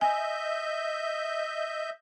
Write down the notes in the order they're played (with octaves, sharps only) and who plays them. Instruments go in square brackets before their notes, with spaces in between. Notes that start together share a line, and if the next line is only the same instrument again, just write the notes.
[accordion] D#5 E5 G6 [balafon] G#5